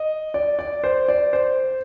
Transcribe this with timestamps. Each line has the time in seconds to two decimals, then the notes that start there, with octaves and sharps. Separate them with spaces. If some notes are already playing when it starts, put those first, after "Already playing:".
Already playing: D#5
0.34 D5
0.59 D5
0.84 C5
1.08 D5
1.33 C5